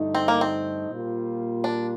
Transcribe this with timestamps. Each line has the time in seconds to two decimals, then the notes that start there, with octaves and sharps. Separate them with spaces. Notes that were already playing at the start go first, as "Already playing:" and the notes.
Already playing: G2 D3 A3 D#4
0.15 C4
0.28 A#3
0.41 C4
0.89 A#2 G3 A#3 F4
1.64 D4